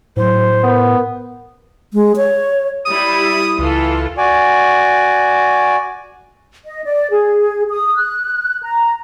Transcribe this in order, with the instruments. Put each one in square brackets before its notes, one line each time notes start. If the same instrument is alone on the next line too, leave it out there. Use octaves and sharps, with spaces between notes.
[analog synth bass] A2 [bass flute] F#3 [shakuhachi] C5
[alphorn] B3 [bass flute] A#4
[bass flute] G#3
C#5
[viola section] G3 E4 [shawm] D#6
[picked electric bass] C#2 [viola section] E3 F4 A4
[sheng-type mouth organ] F#4 D5 G#5
[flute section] D#5
D5
G#4
D#6
F#6
A#5